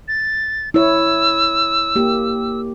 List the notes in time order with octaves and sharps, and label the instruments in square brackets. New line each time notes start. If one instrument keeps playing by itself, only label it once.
[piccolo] A6
[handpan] E4 C#5 [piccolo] E6
[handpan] A#3 G4